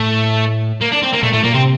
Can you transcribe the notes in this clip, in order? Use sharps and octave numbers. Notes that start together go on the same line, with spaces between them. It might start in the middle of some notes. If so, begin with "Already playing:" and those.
Already playing: A2 A3
A#3
D4
C4
A#3
A#2 A3
A2 A3
A#2 A#3
C3 C4